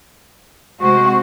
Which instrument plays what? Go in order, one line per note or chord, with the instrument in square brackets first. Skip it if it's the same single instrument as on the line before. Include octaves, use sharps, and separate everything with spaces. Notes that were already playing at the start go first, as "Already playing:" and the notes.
[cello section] C3 G#3 C5 [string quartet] F#4